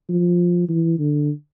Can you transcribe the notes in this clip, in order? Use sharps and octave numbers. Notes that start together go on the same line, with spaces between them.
F3
E3
D3